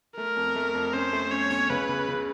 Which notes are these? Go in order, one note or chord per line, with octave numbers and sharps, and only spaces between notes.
A3 A#4
F2
A3
F2
C#4 C5
A3
C#4 C#5
C#4
C#2 B4
C#3
C#3